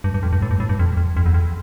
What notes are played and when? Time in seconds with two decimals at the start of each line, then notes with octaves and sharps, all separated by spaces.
0.04 G2
0.14 G2
0.23 F2
0.33 G2
0.42 A2
0.51 G2
0.60 A2
0.69 G2
0.79 F2
0.97 F2
1.17 F2
1.26 E2
1.34 F2